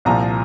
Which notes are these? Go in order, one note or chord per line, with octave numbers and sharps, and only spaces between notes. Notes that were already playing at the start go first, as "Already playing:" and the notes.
C2 A#2 F3 A#5